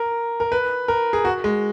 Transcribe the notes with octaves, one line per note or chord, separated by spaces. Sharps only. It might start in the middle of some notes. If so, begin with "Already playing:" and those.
Already playing: A#4
A#4
B4
A#4
G#4
F#4
G#3